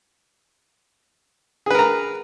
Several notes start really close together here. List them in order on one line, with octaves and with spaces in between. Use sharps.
G#4 B4 A#4 A#5